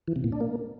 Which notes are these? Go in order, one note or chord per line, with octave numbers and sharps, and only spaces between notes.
E3
C3
A#2
D4
A#3